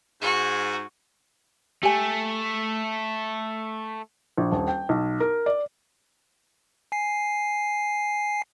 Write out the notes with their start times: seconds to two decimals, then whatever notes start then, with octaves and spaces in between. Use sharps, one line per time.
0.22 G#2 F#4
1.83 A3 G4 G#5
4.38 A#1
4.51 D#1
4.68 G5
4.89 B1
5.20 A#4
5.46 D5
6.92 G#5 C7